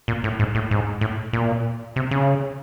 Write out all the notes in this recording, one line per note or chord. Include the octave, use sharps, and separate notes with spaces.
A#2
A2
G#2
A2
G#2
A2
A#2
C3
C#3